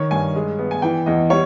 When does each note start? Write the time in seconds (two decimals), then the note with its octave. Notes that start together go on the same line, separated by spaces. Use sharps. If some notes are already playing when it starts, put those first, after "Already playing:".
Already playing: D#3 C#5
0.11 G2 G#5
0.36 G#3
0.59 B3
0.71 G#5
0.82 E3 G5
1.06 E2 D#5
1.30 G3 C#5